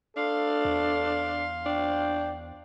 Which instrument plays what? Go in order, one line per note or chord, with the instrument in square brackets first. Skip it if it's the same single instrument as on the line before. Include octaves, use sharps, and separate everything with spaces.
[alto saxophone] D4 [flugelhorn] A4 [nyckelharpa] F5 C6
[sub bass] E2
[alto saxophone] D4 [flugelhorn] G5